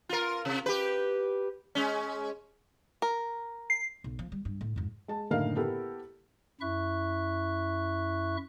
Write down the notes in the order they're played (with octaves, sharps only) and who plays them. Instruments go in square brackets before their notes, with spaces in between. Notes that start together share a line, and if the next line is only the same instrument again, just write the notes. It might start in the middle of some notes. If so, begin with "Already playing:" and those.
[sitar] F4 A#4
C3
G4 B4
G#3 C#4
[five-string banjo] A#4
[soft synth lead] C7
[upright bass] B1
F3
G3
G2
A2
F2 G#2
[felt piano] G#3 A5
F#1 A2 D3 D#4 A#4 F5
B3 E4 G4 A4 A#4
[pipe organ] F#2 E4 E5 C#6 F#6